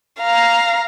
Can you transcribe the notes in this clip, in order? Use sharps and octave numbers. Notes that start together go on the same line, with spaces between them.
F5 A#5